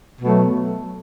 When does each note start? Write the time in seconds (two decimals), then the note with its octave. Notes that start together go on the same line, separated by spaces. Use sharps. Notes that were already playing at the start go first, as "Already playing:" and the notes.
0.21 B2 F#3 A3